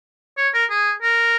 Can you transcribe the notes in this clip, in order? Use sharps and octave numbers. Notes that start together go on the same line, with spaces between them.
C#5
A#4
G#4
A#4